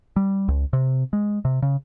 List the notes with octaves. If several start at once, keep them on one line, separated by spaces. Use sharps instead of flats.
G3
C#2
C3
G#3
C3
C#3